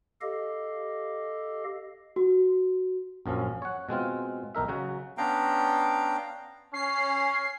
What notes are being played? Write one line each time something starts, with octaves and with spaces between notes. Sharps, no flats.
G4 A4 D#5 F5
F#4
A#1 F#2 F3 C#4
C#5 F#5
B2 G#3 C4 F4
B1 D#4 A#4 E5
C#3 F#3 F#4
B3 C#4 D4 F5 G5 A#5
C#4 C7